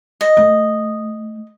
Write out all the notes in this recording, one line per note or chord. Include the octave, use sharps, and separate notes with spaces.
D#5
A3